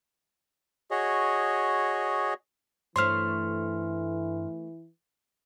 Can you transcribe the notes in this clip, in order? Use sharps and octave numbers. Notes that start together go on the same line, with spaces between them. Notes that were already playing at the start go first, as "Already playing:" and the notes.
F#4 G#4 C#5 D#5
G2 E3 A3 C5 C#5 C6 F6